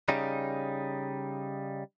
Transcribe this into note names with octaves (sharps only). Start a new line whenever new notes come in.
C#3 G3 D#4